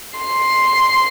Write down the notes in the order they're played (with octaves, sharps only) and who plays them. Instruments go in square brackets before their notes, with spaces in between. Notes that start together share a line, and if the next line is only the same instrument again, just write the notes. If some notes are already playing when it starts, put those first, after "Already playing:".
[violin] C6